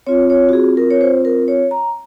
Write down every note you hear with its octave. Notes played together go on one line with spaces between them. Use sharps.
C4 F4 C#5
C#5
F#4
G#4
A#4
C#5
C5
A#4
C#5
A#5